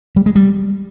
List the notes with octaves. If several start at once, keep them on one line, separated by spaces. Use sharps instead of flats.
G3
G#3
G3